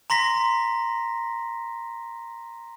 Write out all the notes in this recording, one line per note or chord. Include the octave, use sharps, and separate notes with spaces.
A#5 C6 A#6 B6